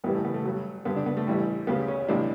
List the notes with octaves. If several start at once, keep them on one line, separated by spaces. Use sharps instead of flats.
A1 G2 E3 G3 B3
A3
B3
A3
G2 F#3
G2 D3 G3 B3
D4
B3
A3
A1 G2 E3 G3
D2 C#3 G3 B3
C#4
B1 A2 E3 G3 D4